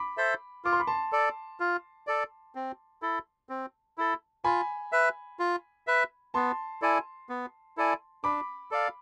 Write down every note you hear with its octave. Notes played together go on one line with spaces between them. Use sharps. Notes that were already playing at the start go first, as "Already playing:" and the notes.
Already playing: B5 D6
A4 C5 E5
F4 D6
C6
B5
A5 C6
A4 D5
F4
A4 D5
C4
E4 A4
C4
E4 A4
F4 G#5 B5
B4 E5
F4
B4 E5
B3 A5 C6
E4 A4 D5 G#5
B3
E4 A4 D5 G#5
D4 B5 D6
A4 D5 F5